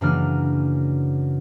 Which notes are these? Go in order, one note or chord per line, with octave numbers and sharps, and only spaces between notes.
F#2 C#3 E3 A#3 D4 F6